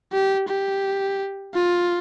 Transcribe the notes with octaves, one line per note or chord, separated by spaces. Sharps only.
G4
G4
F4